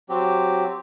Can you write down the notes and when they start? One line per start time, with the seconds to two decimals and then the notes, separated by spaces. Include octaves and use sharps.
0.09 F#3 C4 G4